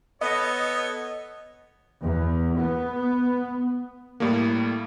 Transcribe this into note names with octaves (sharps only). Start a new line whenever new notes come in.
B3 A4 C#5 D#5
E2
B3
A2 G3 A3 A#3